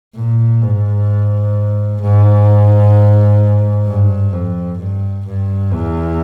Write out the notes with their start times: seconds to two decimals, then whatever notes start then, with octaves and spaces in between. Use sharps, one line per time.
0.15 A#2
0.62 G#2
2.01 G#2
3.86 G2
4.33 F2
4.79 G2
5.26 G2
5.72 E2